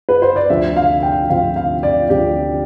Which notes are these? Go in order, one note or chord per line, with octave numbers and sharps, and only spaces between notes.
B4
C5
D5
D2 C3 F3 C4 E5
F5
G5
D2 C3 F3 C4 F5
F5
D5
D2 C3 F3 C4 G4